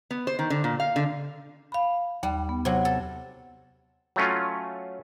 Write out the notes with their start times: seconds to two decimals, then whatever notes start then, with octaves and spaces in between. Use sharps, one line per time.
0.11 B3
0.27 C5
0.39 D#3
0.50 D3
0.64 A#2
0.80 F5
0.96 D3
1.72 F5 B5
2.23 D#2 G3
2.49 B3
2.65 C3 F#3
2.85 A4
4.16 F#3 A3 C#4 F4